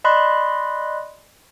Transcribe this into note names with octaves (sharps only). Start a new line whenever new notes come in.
D5 D#5 B5 C6 F#6